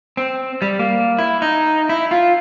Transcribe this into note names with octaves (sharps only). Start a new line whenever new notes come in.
C4
G3
A#3
E4
D#4
E4
F4